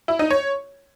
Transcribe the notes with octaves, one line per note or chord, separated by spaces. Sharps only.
E4
D#4
C#5